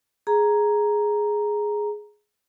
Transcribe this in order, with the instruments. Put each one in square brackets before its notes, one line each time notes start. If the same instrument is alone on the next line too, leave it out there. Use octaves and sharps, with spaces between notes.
[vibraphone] G#4 A#5